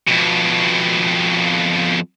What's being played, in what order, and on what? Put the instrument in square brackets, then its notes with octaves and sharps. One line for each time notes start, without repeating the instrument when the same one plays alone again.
[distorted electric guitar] F2 B2